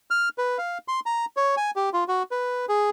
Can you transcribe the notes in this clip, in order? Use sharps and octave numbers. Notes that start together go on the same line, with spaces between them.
F6
B4
F5
C6
A#5
C#5
G#5
G4
F4
F#4
B4
G#4